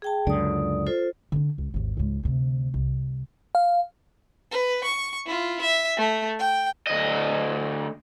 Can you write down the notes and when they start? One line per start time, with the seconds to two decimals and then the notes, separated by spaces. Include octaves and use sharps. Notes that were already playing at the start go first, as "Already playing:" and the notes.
0.02 G#4 G5 A5
0.27 C#2 F#2 D3 D5 D#6
0.86 F4 A4 C5
1.32 D3 D4
1.58 C#2
1.74 G#1 D#2
1.97 C#2 G#2
2.23 D2 C3
2.74 C2
3.55 F5
4.51 B4
4.84 C#6
5.27 E4 F4
5.61 E5
5.97 A3
6.39 G5
6.87 D2 D#5